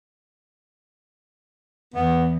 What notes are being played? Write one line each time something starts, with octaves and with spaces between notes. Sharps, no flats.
E2 B3